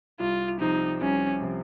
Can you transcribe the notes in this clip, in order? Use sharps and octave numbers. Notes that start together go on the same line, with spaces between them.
C2 F4
C3 F3 C4 D#4
C2 C#4
C3 F3 C4